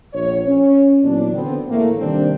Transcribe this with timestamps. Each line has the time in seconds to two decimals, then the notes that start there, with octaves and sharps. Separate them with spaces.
0.13 A#1 C#5
0.46 C#4
1.03 A#2 E3 F#3 B3 D4
1.34 D3 B3 C4
1.68 E2 A2 A3 A#3
1.99 D#2 C3 D#3 G3 C4 D4